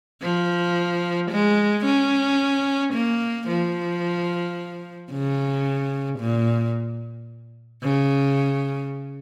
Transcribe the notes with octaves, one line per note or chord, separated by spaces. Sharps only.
F3
G#3
C#4
A#3
F3
C#3
A#2
C#3